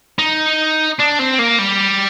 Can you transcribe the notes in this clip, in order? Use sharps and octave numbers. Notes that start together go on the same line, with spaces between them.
D#4
D4
C4
A#3
G3